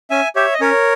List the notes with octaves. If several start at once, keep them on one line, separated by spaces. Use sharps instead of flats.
C#4 E5 G#5
G4 C#5 E5
D#5
C#4 A#4 C#5